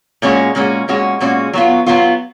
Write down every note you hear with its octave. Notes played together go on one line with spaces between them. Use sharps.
A#2 G#3 C#4 F#4
A#2 G#3 C#4 F#4
A#2 G#3 C#4 F#4
A#2 G#3 C#4 F#4
F#3 B3 F4
F#3 B3 F4